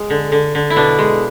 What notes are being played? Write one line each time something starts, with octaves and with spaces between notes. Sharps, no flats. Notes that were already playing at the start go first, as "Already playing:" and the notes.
Already playing: G#3
D3
D3
D3
E4
B2 D4
G#3